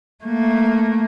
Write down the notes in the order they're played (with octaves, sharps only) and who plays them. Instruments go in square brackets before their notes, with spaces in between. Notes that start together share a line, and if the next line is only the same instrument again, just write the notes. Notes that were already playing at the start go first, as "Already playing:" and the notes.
[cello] A3 A#3